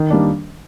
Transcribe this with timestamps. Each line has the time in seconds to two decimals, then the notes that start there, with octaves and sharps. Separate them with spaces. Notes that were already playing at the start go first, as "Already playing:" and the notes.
Already playing: D#3
0.10 G3 A#3 D4